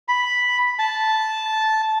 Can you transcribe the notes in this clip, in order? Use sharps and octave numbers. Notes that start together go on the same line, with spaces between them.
B5
A5